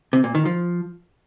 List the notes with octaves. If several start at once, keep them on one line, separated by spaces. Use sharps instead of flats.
C3
A#2
D#3
F3